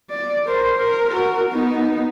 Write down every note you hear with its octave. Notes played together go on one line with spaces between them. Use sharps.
D5
A#4 C5
A#4
F#4 A#4
B3 D#4